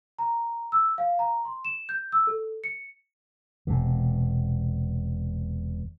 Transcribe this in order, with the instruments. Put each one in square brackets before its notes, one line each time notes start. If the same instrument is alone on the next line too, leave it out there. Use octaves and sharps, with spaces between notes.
[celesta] A#5
E6
F5
A#5
C6
E7
G6
E6
A4
C#7
[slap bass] E1 C3